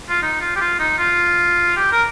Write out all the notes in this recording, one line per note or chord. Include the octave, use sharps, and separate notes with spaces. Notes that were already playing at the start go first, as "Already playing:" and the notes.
F4
D#4
F4
G4
F4
D#4
F4
G4
A#4